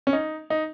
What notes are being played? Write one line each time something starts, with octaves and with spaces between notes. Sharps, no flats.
C#4
D#4
D#4